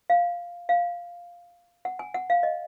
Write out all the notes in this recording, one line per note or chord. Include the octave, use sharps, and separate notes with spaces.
F5
F5
F#5
G#5
F#5
F5
D#5